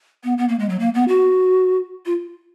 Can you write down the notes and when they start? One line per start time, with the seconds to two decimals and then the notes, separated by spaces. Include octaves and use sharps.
0.24 B3
0.38 B3
0.49 A#3
0.59 G#3
0.69 F#3
0.80 A#3
0.94 B3
1.08 F#4
2.06 F4